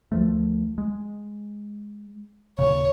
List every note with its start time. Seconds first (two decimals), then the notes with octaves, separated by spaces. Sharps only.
0.12 D2 F3 A3
0.78 G#3
2.59 D#2 A#2 C#3 C#5